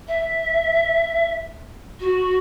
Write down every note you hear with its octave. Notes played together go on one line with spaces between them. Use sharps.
E5
F#4